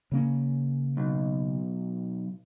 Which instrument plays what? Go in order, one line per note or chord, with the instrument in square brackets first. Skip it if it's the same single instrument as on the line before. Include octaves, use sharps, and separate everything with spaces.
[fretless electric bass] C#3 A#3 C#4
[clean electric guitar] B1